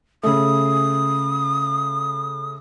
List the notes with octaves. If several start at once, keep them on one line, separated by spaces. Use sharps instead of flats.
C#3 A3 D#6